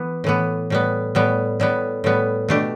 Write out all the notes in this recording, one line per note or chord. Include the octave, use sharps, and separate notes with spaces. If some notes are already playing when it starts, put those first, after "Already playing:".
Already playing: E3 B3
A2 E3 B3
A2 G3 B3
A2 G3 B3
A2 G3 B3
A2 G3 B3
B2 A3 D4 G4